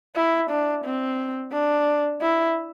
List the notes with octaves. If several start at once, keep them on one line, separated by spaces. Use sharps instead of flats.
E4
D4
C4
D4
E4